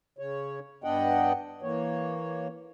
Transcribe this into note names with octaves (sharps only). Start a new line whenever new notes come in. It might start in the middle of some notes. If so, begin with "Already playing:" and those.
C#3 C#5
G2 B3 D4 D#5 F#5 G5
E3 A#3 C#5